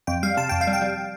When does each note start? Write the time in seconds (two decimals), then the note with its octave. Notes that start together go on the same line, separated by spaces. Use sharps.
0.07 F2 G5
0.23 G3 F5
0.37 C3 A5
0.49 F2 G5
0.61 F5
0.67 G3
0.73 G5
0.82 G3